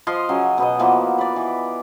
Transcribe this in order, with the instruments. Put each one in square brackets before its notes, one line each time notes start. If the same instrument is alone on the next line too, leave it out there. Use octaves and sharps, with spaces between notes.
[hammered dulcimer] F3 D#5 F5 C6
C#3 F#3 G#5
B2 B3 D#5
E3 F3 A#3 B3
B4 D5
E3